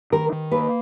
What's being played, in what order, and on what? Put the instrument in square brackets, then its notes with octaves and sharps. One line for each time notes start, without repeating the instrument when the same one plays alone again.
[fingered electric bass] D#3 [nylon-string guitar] A#4
[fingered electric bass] D#3
[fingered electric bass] A#3 [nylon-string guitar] B4